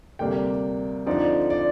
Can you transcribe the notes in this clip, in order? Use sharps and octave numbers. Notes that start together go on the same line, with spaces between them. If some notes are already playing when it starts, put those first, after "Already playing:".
D2 C3 G3 A#3 D4 G5
D2 D3 F3 C4 D#4 D5
D5